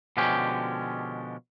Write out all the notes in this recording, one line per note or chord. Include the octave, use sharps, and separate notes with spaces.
B2 D3 F3 G#3 C#4 G4